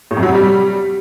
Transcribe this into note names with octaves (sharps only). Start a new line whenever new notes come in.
A2
F2
F#3
C3
G3